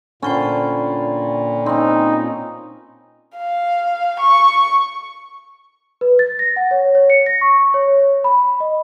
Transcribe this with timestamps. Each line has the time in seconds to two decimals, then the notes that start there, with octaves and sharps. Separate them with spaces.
0.23 A#2 D3 C#4 C5 G5 B5
1.66 C4 C#4 D#4
3.37 F5
4.20 C#6
6.01 B4
6.19 A6
6.39 A#6
6.56 F#5
6.71 C#5
6.95 C#5
7.10 C#7
7.26 A#6
7.41 C#6
7.74 C#5
8.24 B5
8.60 D#5